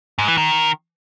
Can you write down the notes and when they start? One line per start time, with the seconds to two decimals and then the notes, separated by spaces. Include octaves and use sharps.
0.19 G#2
0.28 E3
0.38 D#3